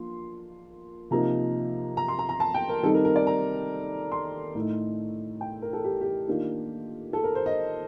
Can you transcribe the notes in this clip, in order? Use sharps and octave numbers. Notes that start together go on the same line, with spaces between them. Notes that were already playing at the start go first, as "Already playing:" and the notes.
Already playing: F3 A#3 D4 F4 C6
C3 F3 A#3 D#4 A#5
A#5
C6
A#5
A#5
A5
G5
A#4
D#3 G3 C4 D#4 A4
A#4
A#4
D5
A#5
C6
A2 A3 D#4
G5
A#4
A4
G4
G4
D#3 A#3 D4 F4
A4
A#4
C5
D#5